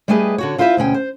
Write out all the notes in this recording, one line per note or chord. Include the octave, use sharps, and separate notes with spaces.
G3 A3 G4 G#4 B4 D#5
D3 F#4 C#5
E4 F4 B4 C5 D5 E5
D2 B2 C#4 G5
C5